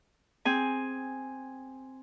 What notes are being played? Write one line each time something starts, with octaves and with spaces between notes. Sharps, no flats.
C4 G#4 G#5